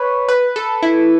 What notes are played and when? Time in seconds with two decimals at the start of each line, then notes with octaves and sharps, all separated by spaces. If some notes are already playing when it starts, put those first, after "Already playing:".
Already playing: B4 C#5
0.28 B4
0.56 A4
0.83 E4